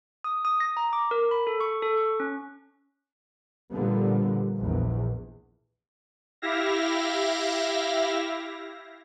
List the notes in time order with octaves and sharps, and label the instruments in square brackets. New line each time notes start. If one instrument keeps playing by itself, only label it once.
[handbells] D#6
D#6
A#6
A#5
D6
A#4
B5
A4
C#6
A4
C#6
C#4
[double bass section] A#2 D3 F3 G3 A#3 B3
A#1 E2
[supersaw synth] E4 G4 E5 F5 A#6